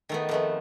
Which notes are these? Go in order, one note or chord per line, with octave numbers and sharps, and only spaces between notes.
D#3 A3 B3
F2 A3 B3